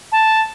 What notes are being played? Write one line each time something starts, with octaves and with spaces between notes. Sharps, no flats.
A5